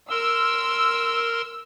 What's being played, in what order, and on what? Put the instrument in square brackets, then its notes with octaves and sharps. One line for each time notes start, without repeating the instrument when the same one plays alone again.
[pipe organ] A#4 C6 [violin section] E6